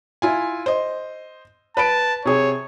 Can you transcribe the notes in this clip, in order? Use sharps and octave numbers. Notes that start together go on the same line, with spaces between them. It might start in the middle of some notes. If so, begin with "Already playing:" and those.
E4 F4 G#5
C5 D#5
B4 A5 B5 D7
C3 G#4 C#5